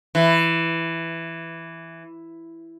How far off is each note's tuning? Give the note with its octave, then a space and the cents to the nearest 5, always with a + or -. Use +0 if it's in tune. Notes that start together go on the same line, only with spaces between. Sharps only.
E3 +5